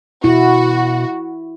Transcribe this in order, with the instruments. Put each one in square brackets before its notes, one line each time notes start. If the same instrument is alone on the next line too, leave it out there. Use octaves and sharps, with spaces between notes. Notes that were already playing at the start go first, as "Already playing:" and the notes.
[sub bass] B2 [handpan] E4 [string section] F#4